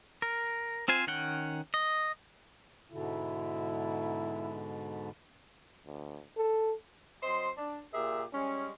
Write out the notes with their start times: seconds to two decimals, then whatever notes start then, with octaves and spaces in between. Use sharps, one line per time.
0.22 A#4
0.88 C4 F4 C5 G#5
1.07 D#3 C#4 F#5 G5
1.74 D#5
2.92 G#2 B2 D3 E4
5.86 D2
6.37 A4
7.23 F#3 C4 C5 D#5 C6
7.58 D4
7.94 A#2 G4 G#4 A#4 E5
8.33 G3 G#3 C#4